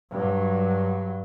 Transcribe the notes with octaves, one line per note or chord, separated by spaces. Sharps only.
G2 F#3